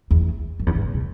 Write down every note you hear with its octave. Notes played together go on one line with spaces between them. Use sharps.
E2
F#2
E2
G#2
C#3
B2